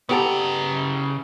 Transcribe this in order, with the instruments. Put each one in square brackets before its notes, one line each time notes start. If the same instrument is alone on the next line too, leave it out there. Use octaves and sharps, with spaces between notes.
[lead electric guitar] C#3 A#5 [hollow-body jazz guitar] B3 G4 A4